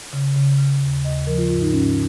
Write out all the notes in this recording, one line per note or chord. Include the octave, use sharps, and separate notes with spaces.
C#3
C#3
C#3
D#2
D#2 D#5
F3 A#4
F4
G#2 F4
D#4
G#2 C#4